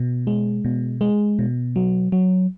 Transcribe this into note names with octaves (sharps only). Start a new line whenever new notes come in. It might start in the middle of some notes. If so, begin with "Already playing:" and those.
Already playing: B2
G#3
B2
G#3
B2
F#3
F#3